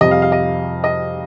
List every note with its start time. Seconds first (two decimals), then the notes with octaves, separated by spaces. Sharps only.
0.01 F2 C3 G3 D#5
0.11 F5
0.22 F5
0.32 D#5
0.84 D#5